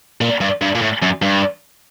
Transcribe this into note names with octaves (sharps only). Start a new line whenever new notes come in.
A#2
G2
G2
A#2
A2
F#2
G2